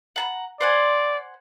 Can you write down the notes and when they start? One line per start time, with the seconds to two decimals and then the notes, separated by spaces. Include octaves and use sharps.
0.16 F#5 A5 A#5
0.61 C5 D5 F#5 G#5